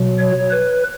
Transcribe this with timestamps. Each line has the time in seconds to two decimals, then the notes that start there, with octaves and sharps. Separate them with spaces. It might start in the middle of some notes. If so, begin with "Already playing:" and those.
Already playing: B2 F#3
0.19 C#5
0.50 B4